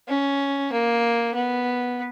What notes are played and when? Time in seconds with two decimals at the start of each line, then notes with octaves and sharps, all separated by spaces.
0.08 C#4
0.72 A#3
1.35 B3